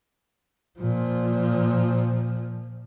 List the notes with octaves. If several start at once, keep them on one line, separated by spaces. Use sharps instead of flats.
A#2 F3